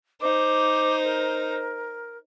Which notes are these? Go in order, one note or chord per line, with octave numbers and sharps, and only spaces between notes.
D#4 C5 D6
A#4